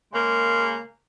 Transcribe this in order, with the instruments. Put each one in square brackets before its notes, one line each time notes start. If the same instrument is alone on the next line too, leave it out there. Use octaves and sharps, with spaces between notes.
[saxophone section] C#3 G#3 A#3